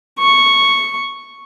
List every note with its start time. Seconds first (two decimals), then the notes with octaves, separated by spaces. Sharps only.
0.19 C#6